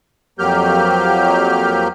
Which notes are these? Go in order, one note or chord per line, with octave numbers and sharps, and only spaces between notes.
F2 F#3 A#3 G4 F6 G6